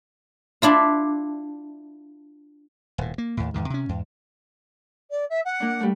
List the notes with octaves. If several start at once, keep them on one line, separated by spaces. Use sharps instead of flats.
D4 E4 F4
D#1 A2
A#3
D#2 A2
E2 G#2 D#3
C3 C#4
E2 G#2
D5
E5
F#5
A#3 D4
G3 A3